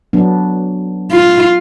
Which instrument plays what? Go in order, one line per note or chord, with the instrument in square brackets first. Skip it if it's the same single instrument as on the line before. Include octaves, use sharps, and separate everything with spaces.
[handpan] F#3 B3 D4
[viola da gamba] F4